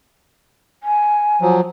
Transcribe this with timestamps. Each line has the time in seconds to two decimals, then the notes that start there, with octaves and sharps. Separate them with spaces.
0.83 G#5
1.42 F3 F#3